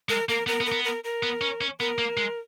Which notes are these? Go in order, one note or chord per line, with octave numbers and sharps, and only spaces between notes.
G#3 A#4
A#3 A#4
B3 A#4
B3
A#4
B3
A#4
A#4
B3
C#4
C#4
B3 A#4
A#3
G#3